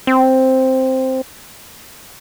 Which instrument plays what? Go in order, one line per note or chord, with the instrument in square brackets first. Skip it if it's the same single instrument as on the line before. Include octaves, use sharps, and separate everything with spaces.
[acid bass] C4